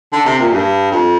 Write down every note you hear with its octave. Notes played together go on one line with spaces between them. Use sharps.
D3
C3
A#2
G2
F2